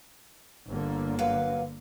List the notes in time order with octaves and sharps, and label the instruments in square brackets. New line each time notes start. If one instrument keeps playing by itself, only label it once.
[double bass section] G1 D3 A#3
[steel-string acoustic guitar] F#3 B4 F5